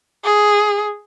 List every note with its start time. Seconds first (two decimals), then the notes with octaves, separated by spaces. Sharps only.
0.24 G#4